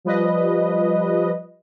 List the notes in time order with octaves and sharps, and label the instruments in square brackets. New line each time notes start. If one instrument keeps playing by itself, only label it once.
[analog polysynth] F3 G3 B4 D#5